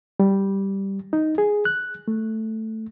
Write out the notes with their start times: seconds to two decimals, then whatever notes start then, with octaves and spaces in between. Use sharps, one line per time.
0.20 G3
1.13 D#4
1.38 G#4
1.65 F#6
2.08 A3